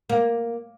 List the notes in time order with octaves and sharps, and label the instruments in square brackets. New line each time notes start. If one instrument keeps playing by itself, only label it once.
[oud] A#3